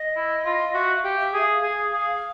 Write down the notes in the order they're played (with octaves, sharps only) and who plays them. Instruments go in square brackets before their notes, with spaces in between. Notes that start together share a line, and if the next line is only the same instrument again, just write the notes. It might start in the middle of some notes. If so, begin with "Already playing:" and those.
Already playing: [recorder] D#5
[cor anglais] E4
F4
[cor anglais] F#4 [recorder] E5
[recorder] F5
[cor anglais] G4
[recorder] E5
[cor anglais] G#4
[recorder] F5
[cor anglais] G#4
G#4